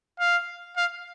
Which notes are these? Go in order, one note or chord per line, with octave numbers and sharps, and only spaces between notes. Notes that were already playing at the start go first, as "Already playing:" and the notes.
F5
F5